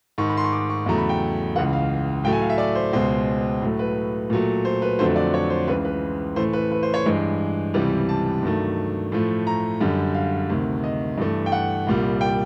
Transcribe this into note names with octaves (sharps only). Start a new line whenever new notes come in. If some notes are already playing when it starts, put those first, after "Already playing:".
G#2 D#3 G#3 C#6
B5
C6
C#6
D6
C#6
E2 C#3 F#3 A3 A#5
B5
G5
C#2 C#3 E3 F#5
F5
A2 F#3 A3 G5
G#5
F5
E5
D5
C5
C#2 B2 G#3 C5
A2 F#3 A3
B4
A#2 F#3 A3
C5
B4
F2 D3 F#3 A3 C5
D5
C#5
C5
C#2 C#3 E3 B4
B4
A2 E3 A3 C5
B4
B4
C5
C#5
G2 E3 G#3
C#2 C3 E3 G3
A5
G2 D#3 F#3 A3
A2 F3 A3
A#5
F#2 D3 G3
F5
D2 C3 D#3
D#5
G2 E3 A3
G5
F#5
C2 A#2 G3
G5